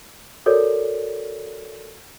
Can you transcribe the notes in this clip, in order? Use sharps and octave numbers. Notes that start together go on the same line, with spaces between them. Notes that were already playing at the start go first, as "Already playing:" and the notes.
F#4 A4 A#4 C#5 D5